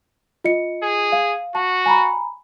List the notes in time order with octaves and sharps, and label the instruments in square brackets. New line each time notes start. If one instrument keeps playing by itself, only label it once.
[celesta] F4 D#5 C#7
[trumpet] G#4
[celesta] F5
[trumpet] F#4 [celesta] A5
[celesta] G#5 A#5 B5